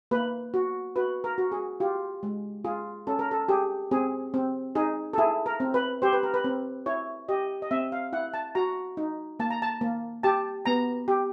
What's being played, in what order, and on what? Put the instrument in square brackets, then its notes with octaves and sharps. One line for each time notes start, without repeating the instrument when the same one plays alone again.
[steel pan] A#3 B4
F#4
F#4 B4
A#4
F#4
G#4
F4 G4
G#3
F4 G#4
C#4 A4
A#4
A4
G4 G#4
C4 G#4
C4
D#4 G#4
A4
E4 G#4
A#4
C4
B4
G4 C5
B4
A#4
B4
C4
E4 C#5
G4 D#5
D#5
C4 E5
F5
E4 F#5
A5
F#4 A#5
D#4
A#3 A5
A#5
A5
A#3
G4 A5
B3 A#5
G4